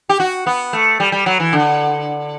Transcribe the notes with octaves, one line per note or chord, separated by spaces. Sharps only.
G4
F#4
B3
A3
G3
G3
F#3
E3
D3